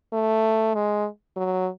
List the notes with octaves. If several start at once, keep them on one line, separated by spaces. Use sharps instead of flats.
A3
G#3
F#3